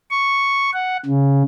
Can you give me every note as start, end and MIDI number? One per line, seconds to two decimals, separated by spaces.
0.11 0.70 85
0.74 0.97 78
1.05 1.43 49